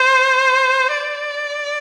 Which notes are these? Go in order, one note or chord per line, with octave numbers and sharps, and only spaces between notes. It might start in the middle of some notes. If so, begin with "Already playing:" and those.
Already playing: C5
D5